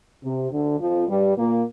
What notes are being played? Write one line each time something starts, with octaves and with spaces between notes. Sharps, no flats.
C3
D2 D3
F2 F3
G2 G3
A#2 A#3